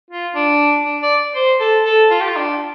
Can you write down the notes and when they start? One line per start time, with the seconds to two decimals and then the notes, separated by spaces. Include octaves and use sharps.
0.11 F4
0.35 D4
0.85 D4
1.02 D5
1.36 C5
1.60 A4
1.85 A4
2.11 F4
2.21 G4
2.29 F4
2.36 D4